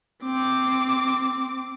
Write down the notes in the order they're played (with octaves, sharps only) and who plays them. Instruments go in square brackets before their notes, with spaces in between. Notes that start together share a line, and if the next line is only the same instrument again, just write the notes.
[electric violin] C4 D6